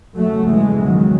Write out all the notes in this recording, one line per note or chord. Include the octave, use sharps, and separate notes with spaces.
E2 C#3 F#3 A3
E3 G#3
D#3 F#3